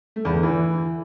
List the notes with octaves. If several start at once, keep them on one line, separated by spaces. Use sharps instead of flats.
A3
E2
D3
E3